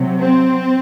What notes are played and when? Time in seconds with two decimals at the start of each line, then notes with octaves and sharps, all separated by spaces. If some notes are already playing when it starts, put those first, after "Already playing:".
Already playing: C3 F#3
0.19 C4